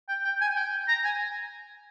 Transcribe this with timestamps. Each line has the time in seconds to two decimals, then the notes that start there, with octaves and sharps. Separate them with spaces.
0.09 G5
0.24 G5
0.41 G#5
0.56 G5
0.88 A#5
1.04 G#5